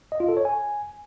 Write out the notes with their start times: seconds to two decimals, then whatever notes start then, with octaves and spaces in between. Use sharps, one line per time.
0.12 D#5
0.20 F4
0.29 A4
0.37 C#5
0.45 G#5